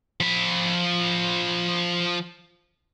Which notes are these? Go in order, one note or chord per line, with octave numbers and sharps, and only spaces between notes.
F3 B5